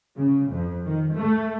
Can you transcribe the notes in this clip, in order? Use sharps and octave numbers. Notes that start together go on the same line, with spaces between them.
C#3
F2
D#3
A3